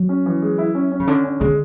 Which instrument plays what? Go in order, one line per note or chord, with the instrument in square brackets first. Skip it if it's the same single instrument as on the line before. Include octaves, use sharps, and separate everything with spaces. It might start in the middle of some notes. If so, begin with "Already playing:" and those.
Already playing: [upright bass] F#3
[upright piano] C#4
E3
G#3
E4
C#4
C#4
[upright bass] C#3
[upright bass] D3 [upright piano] C#4
[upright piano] C#4
[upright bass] D3 [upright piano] G#3